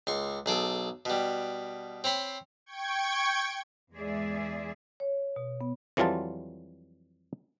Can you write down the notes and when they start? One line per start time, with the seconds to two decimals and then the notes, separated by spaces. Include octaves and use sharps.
0.07 C#2 C6 C#6
0.46 B1 G#4 A4 D6
1.05 B2 G3
2.04 C4 C#5 B5 C6
2.66 G5 C#6 G#6
3.93 E2 G#2 G#3 G#4 D5 E5
5.00 C#5
5.36 B2
5.61 B3
5.97 F2 E3 F#3 G3 F4 A5